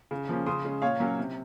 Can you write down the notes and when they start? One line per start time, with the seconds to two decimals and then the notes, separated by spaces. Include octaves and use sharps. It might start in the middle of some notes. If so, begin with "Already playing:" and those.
0.11 C#3
0.29 F3 A#3 C#4
0.47 C#3 C6 D#6
0.65 G#3 C#4
0.82 A#2 C#5 F5
1.00 F#3 A#3 C#4
1.18 C3